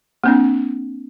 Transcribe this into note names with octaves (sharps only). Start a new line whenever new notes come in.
A#3 C4 D4